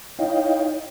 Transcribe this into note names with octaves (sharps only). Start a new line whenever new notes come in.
D#4 E4 C#5 D#5 F5 G5